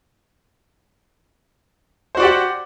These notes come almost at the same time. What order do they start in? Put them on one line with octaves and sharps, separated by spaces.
C5 F#4 D5 G4 F#5